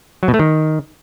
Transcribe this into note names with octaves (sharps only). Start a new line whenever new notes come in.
F#3
B2
A3
D#3